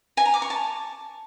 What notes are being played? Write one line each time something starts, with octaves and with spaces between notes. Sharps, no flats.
G#5
A#5
D6
C#6
A5